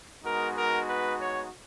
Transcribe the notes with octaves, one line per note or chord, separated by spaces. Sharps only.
G#3 B3 D#4 F#4 A#4
A#4
B4
C#5